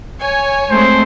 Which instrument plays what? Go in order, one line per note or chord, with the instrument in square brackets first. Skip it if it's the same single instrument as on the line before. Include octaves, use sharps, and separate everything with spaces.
[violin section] C#5 G#5
[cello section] G#3 A3 C4 [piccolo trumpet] C5